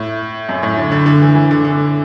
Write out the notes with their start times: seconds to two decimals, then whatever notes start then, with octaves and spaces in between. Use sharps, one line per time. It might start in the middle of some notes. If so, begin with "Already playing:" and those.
Already playing: A2
0.49 F#2
0.63 A2
0.77 D3
0.92 D3
1.06 D3
1.21 E3
1.35 E3
1.51 D3
1.65 D3